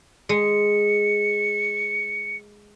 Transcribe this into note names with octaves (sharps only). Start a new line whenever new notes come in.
G#3 C#7